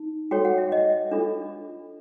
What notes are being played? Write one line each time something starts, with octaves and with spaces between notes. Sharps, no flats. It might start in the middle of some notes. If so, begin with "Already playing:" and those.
Already playing: D#4
F#4 A4 C#5 G5
F#5
E5
D#5
D4 F4 A4